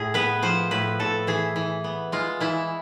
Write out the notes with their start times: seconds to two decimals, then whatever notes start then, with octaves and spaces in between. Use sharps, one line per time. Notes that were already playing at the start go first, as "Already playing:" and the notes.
Already playing: A2 G#4
0.14 B3 B4
0.42 F3 C5
0.71 A2 B4
0.99 A2 A4
1.27 E3 G#4
1.56 E3
1.84 B3
2.12 G#3 F4
2.40 E3 E4